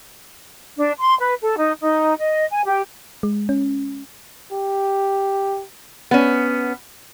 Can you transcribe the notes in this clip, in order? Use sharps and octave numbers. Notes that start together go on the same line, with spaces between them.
D4
C6
B4
A4
D#4
D#4
D#5
G#5
G4
G#3
C#4
G4
B3 C#4